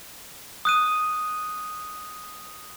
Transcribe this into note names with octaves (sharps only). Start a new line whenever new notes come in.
D#6 F#6 D#7